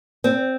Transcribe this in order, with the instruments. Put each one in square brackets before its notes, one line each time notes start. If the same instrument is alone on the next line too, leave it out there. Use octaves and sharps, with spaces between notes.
[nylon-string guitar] C4